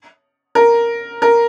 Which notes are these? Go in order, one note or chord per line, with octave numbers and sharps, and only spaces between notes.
A#4
A#4